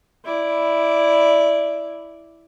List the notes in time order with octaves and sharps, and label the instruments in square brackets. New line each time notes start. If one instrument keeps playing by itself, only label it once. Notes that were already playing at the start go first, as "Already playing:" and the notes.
[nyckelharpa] E4 D5